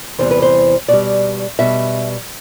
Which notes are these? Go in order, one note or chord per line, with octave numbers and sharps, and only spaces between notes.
E2 C3 E3 G3 C5
B4
C5
B2 G3 D5
B2 G3 E5